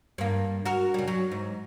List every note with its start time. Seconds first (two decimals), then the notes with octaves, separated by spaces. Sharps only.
0.18 G2 A#3
0.65 F#4 A#4
0.94 C#3 G3
1.08 F#3
1.32 G#2